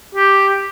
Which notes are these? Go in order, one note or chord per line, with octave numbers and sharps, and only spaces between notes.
G4